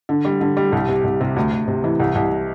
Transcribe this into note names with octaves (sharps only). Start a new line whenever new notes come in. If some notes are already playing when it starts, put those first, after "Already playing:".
D3
G3
D3
G3
C2
C3
C2
C3
D2
D2
C3
E3
C2
C2